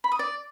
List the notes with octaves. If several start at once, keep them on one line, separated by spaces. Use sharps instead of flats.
B5
D#6
D5